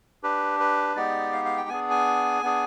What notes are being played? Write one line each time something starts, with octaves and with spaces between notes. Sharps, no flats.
D4 G4 B4
B4
G#3 B3 D#4 G4 D5
F5
F5
G5
B3 D4 G#4 G#5
G#5
B3 D4 G#4